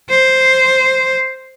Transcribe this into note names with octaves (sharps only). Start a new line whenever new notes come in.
C5